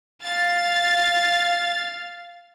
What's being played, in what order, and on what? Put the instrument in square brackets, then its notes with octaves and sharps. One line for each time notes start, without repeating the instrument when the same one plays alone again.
[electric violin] F5 [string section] A6